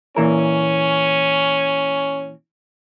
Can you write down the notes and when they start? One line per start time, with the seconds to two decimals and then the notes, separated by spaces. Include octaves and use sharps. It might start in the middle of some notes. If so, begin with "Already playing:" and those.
0.16 A#2 E3 C#4 A#4